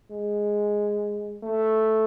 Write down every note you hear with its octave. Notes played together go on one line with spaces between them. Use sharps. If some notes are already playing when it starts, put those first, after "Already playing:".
G#3
A3